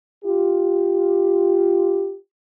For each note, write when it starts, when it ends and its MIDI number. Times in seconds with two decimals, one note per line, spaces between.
0.25 2.16 65
0.25 2.16 67